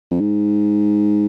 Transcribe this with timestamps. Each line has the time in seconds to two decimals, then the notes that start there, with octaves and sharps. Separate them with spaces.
0.11 F2
0.20 G#2